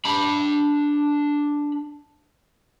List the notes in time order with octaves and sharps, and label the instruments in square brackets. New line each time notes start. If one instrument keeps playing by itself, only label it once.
[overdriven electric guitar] D4 B5